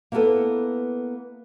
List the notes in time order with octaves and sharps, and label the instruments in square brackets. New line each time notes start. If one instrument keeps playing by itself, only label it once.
[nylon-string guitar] A#3 B3 E4 G4 A4 B4